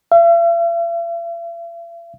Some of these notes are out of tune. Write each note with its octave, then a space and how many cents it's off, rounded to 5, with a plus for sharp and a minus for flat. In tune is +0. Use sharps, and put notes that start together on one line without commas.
E5 +45